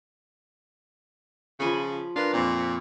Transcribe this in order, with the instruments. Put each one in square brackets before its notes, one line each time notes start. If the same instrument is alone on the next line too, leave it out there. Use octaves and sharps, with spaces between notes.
[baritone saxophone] C#3 [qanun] F3 G#5 B5
[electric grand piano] D4 A#4 B4 [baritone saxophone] F4
[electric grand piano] F2 C4 [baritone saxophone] A#2